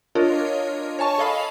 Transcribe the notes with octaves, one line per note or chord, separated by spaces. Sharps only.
D4 F4 A#4 C#5 D#5
C#5 G#5 A5 C#6
A4 D#5 F5 B5